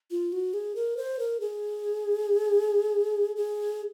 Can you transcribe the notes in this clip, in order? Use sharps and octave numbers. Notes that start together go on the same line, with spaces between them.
F4
F#4
G#4
A#4
C5
A#4
G#4
G#4